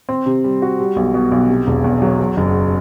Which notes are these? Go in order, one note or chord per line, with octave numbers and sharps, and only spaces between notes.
C4
C3
G3
F#4
G3
B1
B2
B1
C3
E1
E2
F#3
F#3
F#1